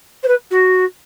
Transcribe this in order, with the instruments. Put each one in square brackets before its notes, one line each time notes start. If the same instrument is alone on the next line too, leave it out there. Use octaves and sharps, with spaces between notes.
[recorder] C5
B4
F#4